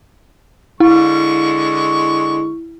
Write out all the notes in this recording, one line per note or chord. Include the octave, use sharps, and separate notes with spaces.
D3 G#3 E4 C#6